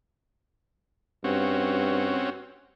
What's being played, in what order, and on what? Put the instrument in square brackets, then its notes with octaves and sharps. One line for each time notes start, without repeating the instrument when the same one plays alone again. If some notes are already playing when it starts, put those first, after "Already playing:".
[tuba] G2 [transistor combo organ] C4 C#4 F#4